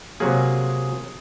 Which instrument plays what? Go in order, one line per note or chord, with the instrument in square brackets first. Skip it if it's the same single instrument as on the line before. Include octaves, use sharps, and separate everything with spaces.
[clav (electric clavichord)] C3 F#3 A#3 [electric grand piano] G#4